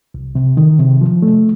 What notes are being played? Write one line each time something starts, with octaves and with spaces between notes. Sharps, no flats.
C2
C3
D#3
C3
F3
A3